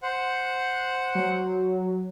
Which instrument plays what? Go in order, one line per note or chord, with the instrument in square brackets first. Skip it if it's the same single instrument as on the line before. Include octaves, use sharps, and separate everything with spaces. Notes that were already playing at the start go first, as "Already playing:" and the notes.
[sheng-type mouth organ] C5 F#5
[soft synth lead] F#3